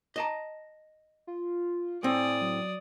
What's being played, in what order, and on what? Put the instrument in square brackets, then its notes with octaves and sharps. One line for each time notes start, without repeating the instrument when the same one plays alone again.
[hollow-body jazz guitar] D#5 A5 A#5
[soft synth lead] F4
[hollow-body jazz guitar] A2 C4 [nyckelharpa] D5 D#6 [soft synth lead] G#5
[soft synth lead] F#3